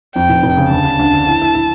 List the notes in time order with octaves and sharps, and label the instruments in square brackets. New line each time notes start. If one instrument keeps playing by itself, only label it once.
[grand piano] F2 [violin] G5
[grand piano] F1
F1
C#3
[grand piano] D2 [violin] A5
[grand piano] D3
D2
D3
E4
E4
E4